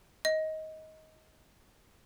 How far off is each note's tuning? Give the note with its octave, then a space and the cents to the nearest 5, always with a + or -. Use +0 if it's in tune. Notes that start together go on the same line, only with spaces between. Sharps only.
D#5 +20